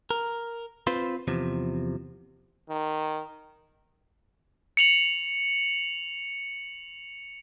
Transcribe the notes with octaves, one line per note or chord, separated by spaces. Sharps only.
A#4
C4 F4 B4 C5
E2 C3 F3
D#3
C#7 F7 F#7